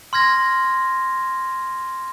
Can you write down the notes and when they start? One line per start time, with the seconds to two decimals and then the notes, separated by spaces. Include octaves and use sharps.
0.13 C6 F6 G#6 A#6